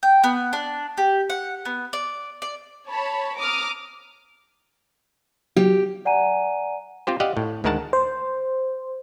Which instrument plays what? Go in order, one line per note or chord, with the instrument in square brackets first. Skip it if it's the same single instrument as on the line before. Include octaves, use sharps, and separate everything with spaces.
[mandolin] G5
B3
D4
G4
F#5
B3
D5
D5
[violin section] C#5 A5 B5
A#5 D6 D#6 F6
[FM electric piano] F#3 [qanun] G4
[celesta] D5 F#5 G#5 A#5 D#7
[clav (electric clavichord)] C4 F4 G4 C5
G4 D5 D#5 F5 F#5
A2
D2 D#3 G#3 A#4 F#5 A5
[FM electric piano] C5